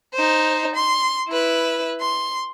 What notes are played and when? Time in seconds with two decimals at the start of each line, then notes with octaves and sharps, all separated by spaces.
0.14 D#4 C5
0.75 C6
1.28 E4 B4
2.01 C6